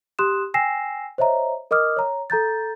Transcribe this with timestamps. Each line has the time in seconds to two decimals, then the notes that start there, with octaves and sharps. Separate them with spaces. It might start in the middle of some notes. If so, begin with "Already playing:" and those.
0.19 G4 C6 D#6 F#6 E7
0.54 G5 G#5 E6 A#6 C7 E7
1.18 C5 C#5 D#5 E5 A#5
1.71 A#4 D#5 D6 D#6 F6
1.97 C#5 A#5
2.30 A4 A#5 G6 A6